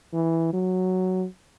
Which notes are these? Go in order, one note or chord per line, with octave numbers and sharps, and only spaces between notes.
E3
F#3